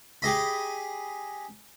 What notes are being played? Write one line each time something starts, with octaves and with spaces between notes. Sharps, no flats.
G4 G#4 D#5 B5